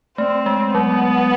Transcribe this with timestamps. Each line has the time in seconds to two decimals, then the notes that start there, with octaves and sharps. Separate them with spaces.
0.18 A3 C4
0.46 G#3
0.75 F#3 B3